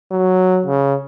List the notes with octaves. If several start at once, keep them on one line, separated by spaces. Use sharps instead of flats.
F#3
C#3